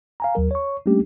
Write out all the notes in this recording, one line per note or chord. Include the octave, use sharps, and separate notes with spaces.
F5 G#5 A#5
D#2 F#3 A#4
C#5 C#6
G3 A3 A#3 C#4 D4 G4